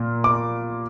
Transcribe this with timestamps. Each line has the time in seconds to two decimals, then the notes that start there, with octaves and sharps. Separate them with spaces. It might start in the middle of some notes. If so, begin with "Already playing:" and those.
Already playing: A#2 A#3
0.24 D6